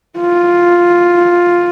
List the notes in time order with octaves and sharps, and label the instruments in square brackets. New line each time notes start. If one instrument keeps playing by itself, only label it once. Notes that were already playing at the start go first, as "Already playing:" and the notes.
[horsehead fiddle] F4